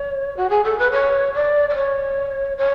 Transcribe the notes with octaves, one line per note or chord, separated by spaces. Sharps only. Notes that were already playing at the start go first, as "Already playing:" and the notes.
Already playing: C#5
F#4
G#4
A4
B4
C#5
D5
D5
C#5
C#5